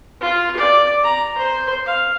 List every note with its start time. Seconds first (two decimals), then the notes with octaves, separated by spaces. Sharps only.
0.20 F4
0.56 D5
1.03 A#5
1.37 C5
1.85 F5